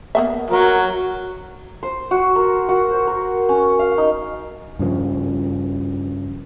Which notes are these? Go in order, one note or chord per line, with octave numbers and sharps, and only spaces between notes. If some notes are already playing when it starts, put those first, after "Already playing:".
A#3 B3 E5
F#3 A#4
C5
F#4
A#4
F#4
C5
A#4
C#4
F5
D#4
G2 C#3 F3